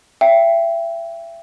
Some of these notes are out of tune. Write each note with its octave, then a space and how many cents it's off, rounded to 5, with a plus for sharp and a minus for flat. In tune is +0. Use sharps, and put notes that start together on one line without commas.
E5 +30 G5 +0